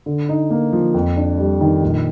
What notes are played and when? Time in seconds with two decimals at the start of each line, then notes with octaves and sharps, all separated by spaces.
0.06 D3
0.29 D#4
0.50 A#3
0.73 F3
0.94 F2
1.16 D4
1.38 G3
1.61 D#3
1.82 A#1